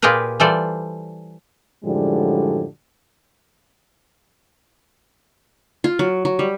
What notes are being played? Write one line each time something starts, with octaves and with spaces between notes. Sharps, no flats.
A#2 F4 G4 G#4 A#4 B4
E3 G3 F4 A4 C5 D5
F#2 A2 D3 F3 G3 G#3
F4
F#3
F#3
G3